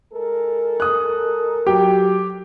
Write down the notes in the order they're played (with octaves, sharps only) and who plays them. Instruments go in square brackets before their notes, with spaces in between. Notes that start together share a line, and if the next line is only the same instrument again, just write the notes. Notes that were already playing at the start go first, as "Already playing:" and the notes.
[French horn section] G#3 A4 A#4
[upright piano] D#6 F#6
[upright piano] F#3 G5 [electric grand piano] G4